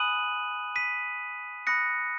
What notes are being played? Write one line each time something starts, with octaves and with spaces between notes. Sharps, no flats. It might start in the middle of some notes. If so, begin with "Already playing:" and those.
Already playing: G#5 B5 D#6 F#6 D#7 F#7
B6 D#7
B5 D#6 F#6 A#6 C#7